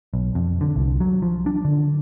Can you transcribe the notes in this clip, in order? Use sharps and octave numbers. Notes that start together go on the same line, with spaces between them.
B1
F2
D3
C2
F#3
F3
D4
D3